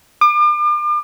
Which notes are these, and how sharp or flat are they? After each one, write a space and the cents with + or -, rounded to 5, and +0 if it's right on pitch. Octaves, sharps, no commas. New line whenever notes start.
D6 +40